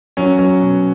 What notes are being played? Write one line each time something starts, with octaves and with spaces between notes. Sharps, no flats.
F#3 C#4
F#3
B2